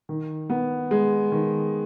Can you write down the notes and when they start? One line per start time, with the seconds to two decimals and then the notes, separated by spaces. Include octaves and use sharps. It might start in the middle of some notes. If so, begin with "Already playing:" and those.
0.09 D#3
0.50 B3
0.91 G#3
1.32 D#3